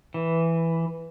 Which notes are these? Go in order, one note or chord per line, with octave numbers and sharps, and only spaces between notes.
E3